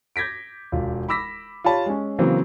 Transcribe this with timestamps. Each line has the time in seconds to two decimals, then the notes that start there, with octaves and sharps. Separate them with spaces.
0.16 G6 G#6 A#6 B6 D7
0.72 E1 F4
1.09 B5 D6 E6 A#6 B6
1.64 F4 G4 C#5 A5 B5
1.86 G#3 C#4
2.18 C#3 E3 F#3 A#3 C4